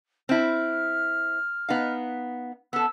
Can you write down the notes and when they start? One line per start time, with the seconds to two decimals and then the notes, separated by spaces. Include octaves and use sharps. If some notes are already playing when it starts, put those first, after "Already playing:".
0.29 C4 E4 F6
1.69 B3 D#4 F5
2.73 B3 A4 E6